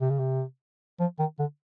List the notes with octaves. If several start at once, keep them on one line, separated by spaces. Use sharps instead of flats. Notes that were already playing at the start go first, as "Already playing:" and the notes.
C3
C#3
C3
F3
D#3
D3